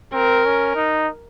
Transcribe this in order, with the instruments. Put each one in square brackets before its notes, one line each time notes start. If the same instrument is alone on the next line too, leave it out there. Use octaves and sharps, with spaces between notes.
[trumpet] C4 [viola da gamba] A#4
[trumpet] C#4
D#4